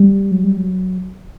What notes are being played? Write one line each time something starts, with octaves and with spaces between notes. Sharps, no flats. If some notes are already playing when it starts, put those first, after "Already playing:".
Already playing: G3
F#3
G3
F#3